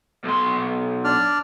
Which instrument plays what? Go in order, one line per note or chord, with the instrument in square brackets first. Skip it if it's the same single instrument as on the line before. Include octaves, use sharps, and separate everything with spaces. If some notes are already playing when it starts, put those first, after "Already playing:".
[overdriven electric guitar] B1 C6
[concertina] D4 D5 F6